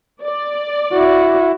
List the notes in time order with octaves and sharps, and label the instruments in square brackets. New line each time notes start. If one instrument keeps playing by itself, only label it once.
[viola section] D5
[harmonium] E4 [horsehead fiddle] F#4